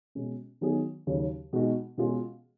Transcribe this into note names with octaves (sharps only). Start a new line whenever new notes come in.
B2 G#3 C#4
D#3 F#3 B3 D#4 G#4
D#2 C#3 F#3
B2 G#3 D#4 F#4
B2 G#3 C#4 F4 G#4